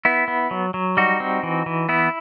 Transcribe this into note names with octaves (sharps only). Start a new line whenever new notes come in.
B3 E4
B3
F#3
F#3
G3 D#4 F#4
C4
E3
E3
B3 E4